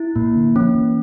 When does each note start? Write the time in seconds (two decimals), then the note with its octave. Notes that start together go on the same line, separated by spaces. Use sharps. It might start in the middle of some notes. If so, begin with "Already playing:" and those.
Already playing: E4
0.16 A#2 A#3
0.35 D3
0.55 F3 C#4
0.75 E3